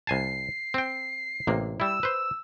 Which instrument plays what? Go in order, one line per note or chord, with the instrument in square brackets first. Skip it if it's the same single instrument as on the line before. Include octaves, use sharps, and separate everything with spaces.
[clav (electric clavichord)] C2 G#5 A5 [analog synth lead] C7
[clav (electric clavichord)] C4 G5
A1 C3 A#3
[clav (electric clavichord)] G3 E4 [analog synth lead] E6
[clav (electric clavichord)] B4 C5